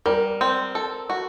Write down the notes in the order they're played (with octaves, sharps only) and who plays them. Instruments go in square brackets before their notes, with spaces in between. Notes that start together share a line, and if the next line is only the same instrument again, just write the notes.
[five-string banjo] G3 [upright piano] A#4
[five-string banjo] C4
A4
F#4